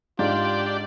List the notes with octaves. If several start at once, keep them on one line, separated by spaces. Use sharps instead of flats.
G#2 D4 F4 G4 D5